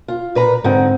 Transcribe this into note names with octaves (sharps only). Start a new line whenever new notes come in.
F4
A#2 B4 A#5
G#2 D3 C4 D#4 F#5